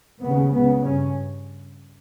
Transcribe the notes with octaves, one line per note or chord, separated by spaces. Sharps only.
D#2 C#3 B3
C#2 C#3 B3
G2 C#4